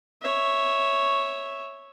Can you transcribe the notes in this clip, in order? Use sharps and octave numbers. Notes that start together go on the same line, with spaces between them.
C#5 E5